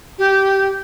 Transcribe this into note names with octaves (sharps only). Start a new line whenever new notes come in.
G4